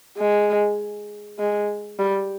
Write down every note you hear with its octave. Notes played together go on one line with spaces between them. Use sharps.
G#3
G#3
G3